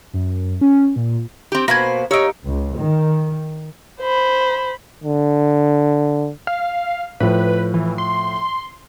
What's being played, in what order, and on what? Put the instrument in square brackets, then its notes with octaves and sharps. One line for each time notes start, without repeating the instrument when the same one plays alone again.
[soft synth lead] F#2
C#4
A#2
[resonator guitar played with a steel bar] C4 G4
[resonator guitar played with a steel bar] B2 [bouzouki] A#3 B4 C5 [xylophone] G#6 A#6
[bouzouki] A#3 D#4 [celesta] G4 E6 D7 [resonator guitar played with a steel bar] C#5
[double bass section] C#2
D#3
[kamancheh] C5 B5
[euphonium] D3
[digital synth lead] F5
[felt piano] A2 F3 [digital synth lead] B4
[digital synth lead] E3
C6